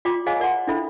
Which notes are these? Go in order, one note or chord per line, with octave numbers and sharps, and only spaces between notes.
F4 D5 G5 C6 D6
G#4 C5 C#5 D#5 F5 G#5
A#4 D5 F#5 A#5 C6
D4 E4 A4 C5 E5 B5